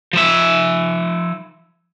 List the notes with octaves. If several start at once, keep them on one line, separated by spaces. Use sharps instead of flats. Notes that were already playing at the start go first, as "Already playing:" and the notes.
F3 E5